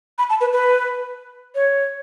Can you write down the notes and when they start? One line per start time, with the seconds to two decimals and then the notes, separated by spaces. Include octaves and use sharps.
0.18 B5
0.30 A5
0.41 B4
0.52 B4
1.55 C#5